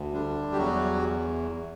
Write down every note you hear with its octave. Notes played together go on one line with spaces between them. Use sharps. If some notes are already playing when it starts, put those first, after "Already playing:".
Already playing: D2
D3 G3 D4
G4
E2 F#3 F#4